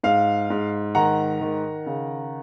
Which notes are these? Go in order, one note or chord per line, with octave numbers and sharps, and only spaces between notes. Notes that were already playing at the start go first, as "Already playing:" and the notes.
G#2 F5
G#2
D#3 F#5 A#5
D#3
C#3